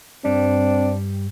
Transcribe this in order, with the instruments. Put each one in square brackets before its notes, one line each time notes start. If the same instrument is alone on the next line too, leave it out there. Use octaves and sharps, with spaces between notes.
[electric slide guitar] G2 G3 [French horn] C4 [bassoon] D4